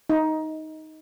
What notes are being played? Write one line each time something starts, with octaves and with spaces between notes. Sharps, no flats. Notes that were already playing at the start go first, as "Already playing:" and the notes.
D#4